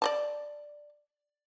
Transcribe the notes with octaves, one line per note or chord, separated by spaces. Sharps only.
D5 D#5 A5